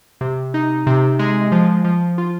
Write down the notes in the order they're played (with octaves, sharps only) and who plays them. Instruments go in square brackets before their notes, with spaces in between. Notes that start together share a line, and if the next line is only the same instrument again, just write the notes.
[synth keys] C3
D#4
C3
G#3
F3
F3
F4